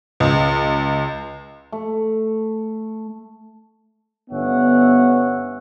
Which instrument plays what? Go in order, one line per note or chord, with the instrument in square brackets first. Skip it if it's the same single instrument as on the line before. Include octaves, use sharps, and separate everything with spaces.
[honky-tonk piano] C#2
[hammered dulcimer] A3
[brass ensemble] G1 B3 C#4 E5 F#5